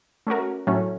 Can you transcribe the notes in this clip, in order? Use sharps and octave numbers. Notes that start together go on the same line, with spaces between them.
A3 C#4 F#4 A#4
A2 F#3 A3 C#4